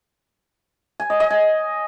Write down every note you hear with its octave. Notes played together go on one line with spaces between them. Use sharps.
G#5
D#5
D#5
G#5